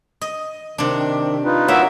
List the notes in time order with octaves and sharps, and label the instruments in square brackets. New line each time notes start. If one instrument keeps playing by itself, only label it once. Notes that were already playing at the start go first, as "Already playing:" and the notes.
[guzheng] D#5
[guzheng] C3 D4 [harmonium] D#3
[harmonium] D#4 F4 B4
[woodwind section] F#3 E5 [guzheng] A#3